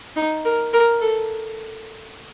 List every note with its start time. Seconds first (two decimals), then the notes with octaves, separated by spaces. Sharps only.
0.16 D#4
0.45 A#4
0.73 A#4
1.01 A4